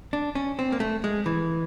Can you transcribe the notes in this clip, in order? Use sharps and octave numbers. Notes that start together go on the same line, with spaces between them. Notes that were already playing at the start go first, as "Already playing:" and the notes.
D4
C#4
C4
A#3
A3
G#3
E3